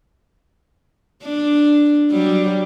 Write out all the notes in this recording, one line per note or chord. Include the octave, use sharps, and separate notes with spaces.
D4
F#3 G3